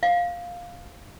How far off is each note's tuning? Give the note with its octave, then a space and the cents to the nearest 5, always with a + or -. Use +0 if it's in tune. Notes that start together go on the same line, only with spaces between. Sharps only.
F5 +5